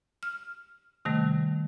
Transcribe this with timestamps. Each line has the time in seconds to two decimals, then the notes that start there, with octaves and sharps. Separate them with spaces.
0.23 F6
1.05 C3 D#3 G3 A3